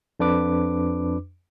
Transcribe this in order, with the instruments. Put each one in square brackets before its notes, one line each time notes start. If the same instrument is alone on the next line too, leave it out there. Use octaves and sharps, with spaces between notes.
[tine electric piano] F2 D4 B4 D6